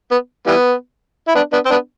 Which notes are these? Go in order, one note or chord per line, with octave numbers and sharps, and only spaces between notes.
B3
E3 G3 B3
E4
B3 D4
B3 D4
C4
B3 D4